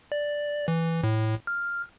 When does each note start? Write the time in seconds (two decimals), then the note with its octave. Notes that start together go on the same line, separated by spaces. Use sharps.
0.12 D5
0.68 E3
1.03 A2
1.47 F6